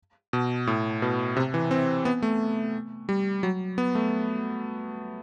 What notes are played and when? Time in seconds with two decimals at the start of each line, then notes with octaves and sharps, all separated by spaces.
0.33 B2
0.67 A2
1.02 B2
1.37 C3
1.54 E3
1.71 C4
2.05 B3
2.22 A3
3.09 G3
3.43 F#3
3.78 B3
3.95 A3